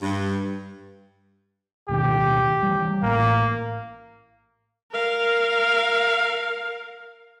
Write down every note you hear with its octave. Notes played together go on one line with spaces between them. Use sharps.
G2
D1 B2 D#3 G4
E3 G3
A1 A2 A#3
A#4 F5